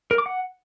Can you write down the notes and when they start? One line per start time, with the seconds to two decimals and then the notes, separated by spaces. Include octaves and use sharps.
0.11 A#4
0.18 D6
0.26 F#5